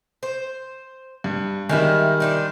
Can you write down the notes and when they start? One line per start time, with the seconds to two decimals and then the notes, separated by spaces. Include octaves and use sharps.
0.23 C5
1.24 G2
1.69 D#3 G3 G#3 D#5 E5
2.20 D4 D#4 C5